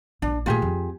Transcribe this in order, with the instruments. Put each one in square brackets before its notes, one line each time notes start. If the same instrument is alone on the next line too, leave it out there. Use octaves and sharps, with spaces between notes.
[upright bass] A#1 [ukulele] D4
[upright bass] A#2 A3 [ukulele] F4 G4 G#4
[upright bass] F2